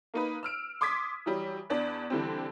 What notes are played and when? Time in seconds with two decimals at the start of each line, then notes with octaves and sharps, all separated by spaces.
0.14 A#3 D#4 B4
0.43 E6 F6 D7
0.81 C6 D6 D#6 G#6 B6
1.26 E3 F#3 G3
1.70 E2 B3 D4
2.10 D3 E3 G3 C4